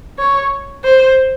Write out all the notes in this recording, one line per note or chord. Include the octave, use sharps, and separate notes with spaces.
C#5
C5